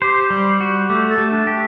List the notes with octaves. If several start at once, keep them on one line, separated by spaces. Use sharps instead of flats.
G4 C5
G3
F#4
A3 G4
A4
A3
D4
G4